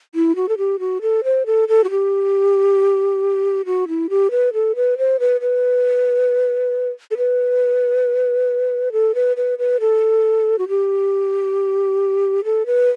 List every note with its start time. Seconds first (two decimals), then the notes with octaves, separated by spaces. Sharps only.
0.15 E4
0.36 F#4
0.49 A4
0.58 G4
0.80 F#4
1.02 A4
1.24 C5
1.46 A4
1.68 A4
1.84 F#4
1.90 G4
3.66 F#4
3.88 E4
4.10 G4
4.31 B4
4.53 A4
4.76 B4
4.98 C5
5.20 B4
5.41 B4
7.11 A4
7.17 B4
8.92 A4
9.15 B4
9.37 B4
9.59 B4
9.80 A4
10.59 F#4
10.69 G4
12.44 A4
12.66 B4